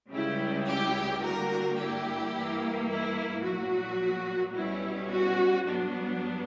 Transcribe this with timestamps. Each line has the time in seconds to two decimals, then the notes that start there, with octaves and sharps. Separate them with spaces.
0.12 C#2 C#3 G3 E4
0.67 E4 G4
1.22 G2 D3 G3 A#3 F#4 A#4
1.78 E4 G4
2.34 G2 E3 A#3
2.89 E4
3.43 B1 A#2 F#3 F#4
4.54 B1 B2 G3 C#4 E4
5.10 F#4
5.65 G2 F#3 B3 D4